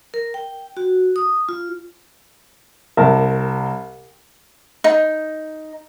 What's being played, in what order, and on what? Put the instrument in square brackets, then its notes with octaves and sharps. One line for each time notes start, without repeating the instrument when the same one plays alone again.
[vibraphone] A#4
G5
F#4
D#6
F4
[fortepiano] C2 A#4 A5
[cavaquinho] D#4